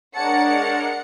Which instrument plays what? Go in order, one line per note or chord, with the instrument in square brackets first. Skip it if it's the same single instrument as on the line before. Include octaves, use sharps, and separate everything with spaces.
[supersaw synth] G#3 D4 A#4 [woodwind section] C#5 [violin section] F#5 C#7 [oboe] A5